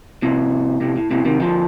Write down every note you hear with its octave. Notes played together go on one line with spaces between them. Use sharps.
A2 C3
A2 C3
A2
A2 C3
C3 D#3
D3 F3